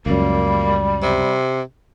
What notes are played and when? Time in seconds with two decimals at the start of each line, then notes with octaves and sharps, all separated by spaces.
0.06 C#2 F#2 G3 A#3
1.02 C3